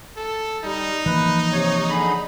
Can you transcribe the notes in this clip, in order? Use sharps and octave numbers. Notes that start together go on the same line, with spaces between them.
A4
G3 D#4
E3 F3 A#3 B4
C3 C#5
D3 G#4 B5